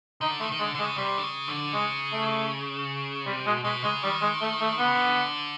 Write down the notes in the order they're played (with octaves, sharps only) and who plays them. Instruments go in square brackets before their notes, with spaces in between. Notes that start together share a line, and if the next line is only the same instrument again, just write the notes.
[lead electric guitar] D3 [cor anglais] D#4
[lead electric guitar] D#3 [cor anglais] A3
[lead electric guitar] D#3
[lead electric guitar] D3 [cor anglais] G#3
[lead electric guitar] D3 [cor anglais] G#3
[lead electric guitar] C#3
[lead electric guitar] C3 [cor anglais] G3
[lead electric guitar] D3
C#3
D3
[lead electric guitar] C#3 [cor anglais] G#3
[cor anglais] A3
[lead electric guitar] C3 [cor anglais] G3
[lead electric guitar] B2 [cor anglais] G#3
[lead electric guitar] B2 [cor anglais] G#3
[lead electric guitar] C#3 [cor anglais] G#3
[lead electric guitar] D#3 [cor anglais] G3
[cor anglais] G#3
A3
A3
[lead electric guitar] D3 [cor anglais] B3
[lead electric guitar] C#3
D3